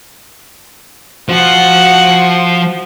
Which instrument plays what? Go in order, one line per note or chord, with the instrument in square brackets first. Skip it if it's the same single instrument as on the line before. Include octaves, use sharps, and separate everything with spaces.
[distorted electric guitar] F3 [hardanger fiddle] F#4 F#5